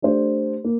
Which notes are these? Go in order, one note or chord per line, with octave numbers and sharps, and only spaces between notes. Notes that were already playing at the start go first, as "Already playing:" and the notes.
A3 D4 G4 C5
A#3